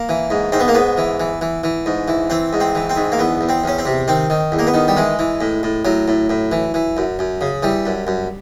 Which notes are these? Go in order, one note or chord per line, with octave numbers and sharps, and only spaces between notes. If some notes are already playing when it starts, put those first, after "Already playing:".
Already playing: A#3
E3
G#2
G#2 C4
B3
A#3
G#2 B3
E3
E3
E3
E3
G#2
E3
E3 C4
G#2
C4
E3
C4
G#2
A#3
E2 B3
E2
C4
E2 C#4
C4
C3
D#3 C4
D#3
E2
A#3
B3
D#3
G3
E3 G#3
E3
A2
A2
A2 F#3
A2
A2
E3
E3
F#2
F#2
C#3
E3 G3
F#2
F#2